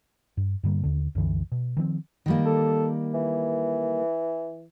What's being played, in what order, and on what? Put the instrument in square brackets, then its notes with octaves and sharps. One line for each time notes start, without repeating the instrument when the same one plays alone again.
[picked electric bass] G2
G2 D3 G3 A#3
D#2 D3
C2 F#2 D3 E3
B2
D#3 F3 B3 C4
[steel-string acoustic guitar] D#3 G3 A#3
[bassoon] A4
E3